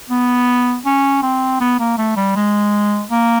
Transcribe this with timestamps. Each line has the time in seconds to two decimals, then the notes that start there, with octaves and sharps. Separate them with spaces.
0.10 B3
0.86 C#4
1.23 C4
1.61 B3
1.79 A#3
1.98 A3
2.16 G3
2.36 G#3
3.11 A#3